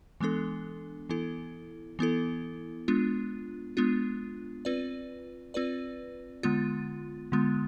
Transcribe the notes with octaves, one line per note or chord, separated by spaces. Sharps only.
E3 G#3 B3 D4 A4
E3 B3 E4 A4
E3 B3 E4 A4
G#3 B3 D4 F4
G#3 B3 D4 F4
C4 F4 B4 D5
C4 F4 B4 D5
D3 G#3 B3 F4
D3 G#3 B3 F4